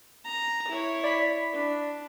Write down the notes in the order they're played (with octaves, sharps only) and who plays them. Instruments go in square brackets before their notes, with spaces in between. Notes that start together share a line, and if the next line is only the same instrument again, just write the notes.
[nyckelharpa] A#5
E4 C#5
[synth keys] D5 B5 B6
[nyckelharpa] D4